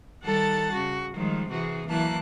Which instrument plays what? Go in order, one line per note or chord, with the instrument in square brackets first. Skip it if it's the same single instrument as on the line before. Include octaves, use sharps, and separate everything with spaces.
[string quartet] D#3 G3 A4 F#5 A5 A6
C#3 F#4
D#3 F3 G3 G#3
C3 E3 F#4 G#4
E3 F#3 A#3 E4 A5 F#6